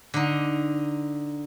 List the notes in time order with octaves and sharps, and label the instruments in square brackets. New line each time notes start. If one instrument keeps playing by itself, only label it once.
[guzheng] D3 D#4